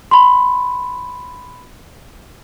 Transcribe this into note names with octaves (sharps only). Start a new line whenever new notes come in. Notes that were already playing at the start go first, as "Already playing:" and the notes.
B5 C6